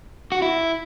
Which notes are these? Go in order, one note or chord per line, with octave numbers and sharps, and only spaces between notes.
F#4
E4